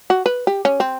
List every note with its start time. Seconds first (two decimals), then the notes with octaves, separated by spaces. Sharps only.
0.10 F#4
0.26 B4
0.47 G4
0.65 C#4
0.80 C4